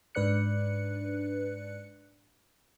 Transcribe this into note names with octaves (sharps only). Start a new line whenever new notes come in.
G#2 D4 B4 D5 F#6 C#7